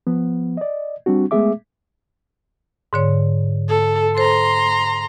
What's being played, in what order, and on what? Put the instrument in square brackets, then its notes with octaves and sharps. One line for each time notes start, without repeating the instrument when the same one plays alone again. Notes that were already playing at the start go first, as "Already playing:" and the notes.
[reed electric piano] F3 B3
D5 D#5
G3 C4 D4 F#4
G#3 A3 B3 G#4 E5 D6
[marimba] G#2 D3 C#5
[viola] A4
[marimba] A4 C5 [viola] A#5 C6